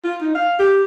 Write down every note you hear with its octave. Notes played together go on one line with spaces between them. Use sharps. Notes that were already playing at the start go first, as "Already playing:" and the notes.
F4
D#4
F5
G4